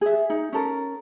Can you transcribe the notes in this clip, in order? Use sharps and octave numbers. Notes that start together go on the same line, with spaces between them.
G#4 E5
D#4
C#4 A4 A#4